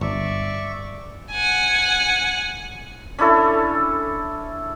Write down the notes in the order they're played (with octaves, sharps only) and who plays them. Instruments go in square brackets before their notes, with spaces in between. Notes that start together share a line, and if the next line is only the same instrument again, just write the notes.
[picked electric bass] G1 [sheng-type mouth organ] D5 E5 C#6
[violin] F#5 G#5
[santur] C#4 D4 E4 A4